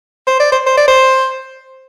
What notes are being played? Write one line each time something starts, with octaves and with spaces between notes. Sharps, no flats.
C5
D5
C5
C5
D5
C5